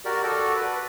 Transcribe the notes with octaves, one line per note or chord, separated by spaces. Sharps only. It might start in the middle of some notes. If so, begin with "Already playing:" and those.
F#4 G4 A#4 D5
F#4 A4 D5
B4